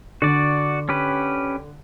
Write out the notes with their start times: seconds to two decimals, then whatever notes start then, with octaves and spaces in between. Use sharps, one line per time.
0.22 D3 F#4 D5
0.89 C#4 G4 B4